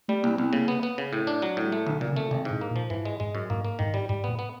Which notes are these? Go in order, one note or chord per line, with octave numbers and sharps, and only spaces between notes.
G3 A3
C2 A#3
C2 B3
C#3 A#3
B3
B3
C#3
A2
D4
F#3
A2
G3
G#3 A3
B1 D3
A#2 C#3
C#3
C3 A3
G#1 C3
G#2
A2
A#3
A#2
F3
G#2 E3
G#3
G#2 G#3
F#2
G#2 A#3
A#3
G#2 D#3
G3
G#2 G3
A2 B3
B3